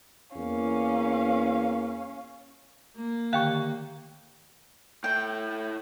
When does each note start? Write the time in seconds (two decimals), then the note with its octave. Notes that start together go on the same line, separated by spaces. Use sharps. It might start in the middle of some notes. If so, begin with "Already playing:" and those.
0.36 E2 A#3 C#4 F5
2.97 A#3
3.33 D3 D#3 G4 F5 G5 C#6
5.04 A2 A3 G5